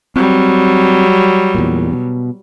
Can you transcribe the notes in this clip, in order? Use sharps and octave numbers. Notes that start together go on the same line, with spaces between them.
F#3 G3 C4
E2 A#2
B2